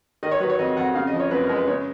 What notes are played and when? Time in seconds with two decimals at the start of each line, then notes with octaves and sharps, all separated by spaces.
0.23 D#3 D#5
0.31 C#5
0.40 F#3 B4
0.50 C#5
0.59 F2 D#5
0.77 F2 F#5
0.95 C#3 F5
1.07 D#5
1.13 F3
1.20 C#5
1.31 F#2 B4
1.44 A#4
1.49 G#3
1.55 B4
1.67 C#3 C#5